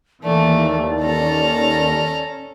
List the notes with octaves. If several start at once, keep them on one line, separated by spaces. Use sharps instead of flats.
D#2 E3 A3 A#3 D5
C#4 A4 A#5